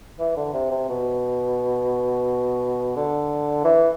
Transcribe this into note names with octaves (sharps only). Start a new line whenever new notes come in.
E3
D3
C3
C3
B2
D3
E3